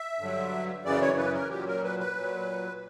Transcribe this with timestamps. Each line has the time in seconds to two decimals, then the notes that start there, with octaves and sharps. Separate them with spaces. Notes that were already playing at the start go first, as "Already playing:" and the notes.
Already playing: E5
0.19 G2 D3 F#3
0.85 F#2 C#3 E3 D5
1.01 C#5
1.18 B4
1.34 A#4
1.50 A#2 F#3 G4
1.67 A#4
1.83 B4
1.99 B4
2.16 A#2 F#3